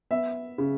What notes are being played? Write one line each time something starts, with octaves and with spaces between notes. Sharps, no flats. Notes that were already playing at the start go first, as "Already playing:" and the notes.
B3 E5
C#3